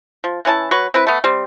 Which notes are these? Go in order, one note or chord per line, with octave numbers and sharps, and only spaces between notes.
F3
E3 C#4 E4 A5
F#3 B4 C#6
C4 E4 B4
A3 B3
G3 C4